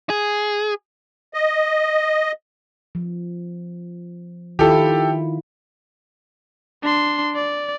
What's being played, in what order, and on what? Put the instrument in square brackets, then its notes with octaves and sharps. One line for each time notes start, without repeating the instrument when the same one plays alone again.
[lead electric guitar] G#4
[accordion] D#5
[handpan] F3
[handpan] D#3 E4 F4 [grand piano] G4 A4
[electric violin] D4 C6
D5